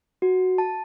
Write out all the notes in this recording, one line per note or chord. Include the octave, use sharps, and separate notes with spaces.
F#4
A5